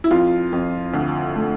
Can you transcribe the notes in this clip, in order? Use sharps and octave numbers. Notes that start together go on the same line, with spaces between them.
E4
F2 F4
F2
D2
A3